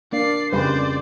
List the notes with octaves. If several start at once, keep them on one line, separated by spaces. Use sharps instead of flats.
A#3 D4 D5 F5 C7
F2 C#3 F3 G3 B4 C5 D5